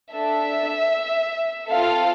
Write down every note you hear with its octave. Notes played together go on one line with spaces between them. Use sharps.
D4 A4 E5
C4 F4 A4 F5